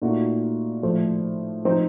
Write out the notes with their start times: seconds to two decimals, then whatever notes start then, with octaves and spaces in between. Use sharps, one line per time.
0.02 A#2 A3 D#4 F#4
0.83 A2 F3 A3
1.65 F3 C4 D#4